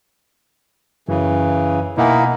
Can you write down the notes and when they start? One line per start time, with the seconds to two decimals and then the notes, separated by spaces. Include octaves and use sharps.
1.08 F#2 C#3 E3
1.97 B2 A#3 D#4 E4 F#5 G#5